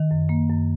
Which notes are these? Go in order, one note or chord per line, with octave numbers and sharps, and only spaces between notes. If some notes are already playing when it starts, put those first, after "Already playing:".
Already playing: D#3
F#2
A#3
F#2